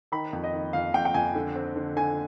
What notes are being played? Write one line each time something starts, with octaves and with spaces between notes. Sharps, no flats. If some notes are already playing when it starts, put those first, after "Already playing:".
D#3 B5
F2
D#5
D#3
F2 F5
F2 G5
G5
F2 G#5
D3
C4
D3
D3 G#5